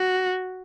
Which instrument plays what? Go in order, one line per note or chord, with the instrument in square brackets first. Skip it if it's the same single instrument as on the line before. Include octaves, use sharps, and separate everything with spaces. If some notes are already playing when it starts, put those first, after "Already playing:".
Already playing: [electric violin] F#4